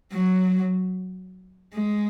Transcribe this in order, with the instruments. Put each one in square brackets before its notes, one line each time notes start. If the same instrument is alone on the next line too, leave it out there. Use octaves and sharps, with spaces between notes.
[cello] F#3
G#3